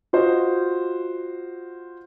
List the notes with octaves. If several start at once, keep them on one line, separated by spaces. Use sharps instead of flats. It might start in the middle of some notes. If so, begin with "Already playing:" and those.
F4 F#4 C5 D#5